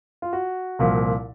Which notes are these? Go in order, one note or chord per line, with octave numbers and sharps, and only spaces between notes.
F4
F#4
C2 A#2 F3